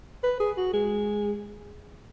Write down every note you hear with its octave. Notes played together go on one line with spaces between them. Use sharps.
B4
G#4
F#4
G#3